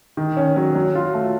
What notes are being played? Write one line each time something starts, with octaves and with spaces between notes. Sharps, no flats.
D#3
C#4
F#3
F#3
F4
A3